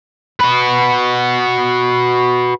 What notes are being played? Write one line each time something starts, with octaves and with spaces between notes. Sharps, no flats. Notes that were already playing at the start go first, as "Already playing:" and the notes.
F#4 B4